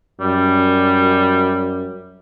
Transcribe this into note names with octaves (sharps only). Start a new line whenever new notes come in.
F#2 G3